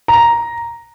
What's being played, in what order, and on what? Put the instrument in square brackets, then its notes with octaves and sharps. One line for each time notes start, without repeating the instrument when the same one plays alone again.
[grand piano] A#5